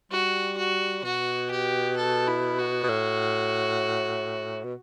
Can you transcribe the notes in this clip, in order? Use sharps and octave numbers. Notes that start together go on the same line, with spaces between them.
G3 F#4
F#4
B2 F#4
G4
A4
E4
F#4
B2
A2
B2